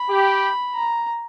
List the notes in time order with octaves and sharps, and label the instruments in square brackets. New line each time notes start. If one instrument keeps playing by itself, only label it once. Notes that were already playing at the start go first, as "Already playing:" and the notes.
Already playing: [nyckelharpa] B5
[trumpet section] G4
[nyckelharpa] A#5